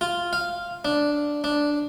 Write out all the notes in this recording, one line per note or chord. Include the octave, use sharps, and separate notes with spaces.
F4
F5
D4
D4